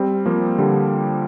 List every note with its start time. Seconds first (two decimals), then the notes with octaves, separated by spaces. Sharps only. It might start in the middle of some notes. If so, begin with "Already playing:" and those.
Already playing: G3 C4
0.26 F3 A#3
0.58 D3 G3